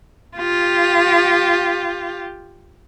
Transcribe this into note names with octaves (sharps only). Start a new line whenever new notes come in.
F4 G4